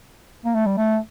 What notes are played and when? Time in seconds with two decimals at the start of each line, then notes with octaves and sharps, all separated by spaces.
0.45 A#3
0.55 A3
0.66 G3
0.78 A3